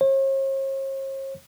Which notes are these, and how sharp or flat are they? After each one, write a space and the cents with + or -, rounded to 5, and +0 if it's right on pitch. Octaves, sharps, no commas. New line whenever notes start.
C#5 -45